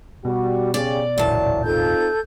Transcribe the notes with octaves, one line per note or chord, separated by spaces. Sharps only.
B2 G3 F#4
C#3 G4 D5
E1 A1 D2 A#2 F#3 E4 D5 A5
C4 D#4 F4 A4 G6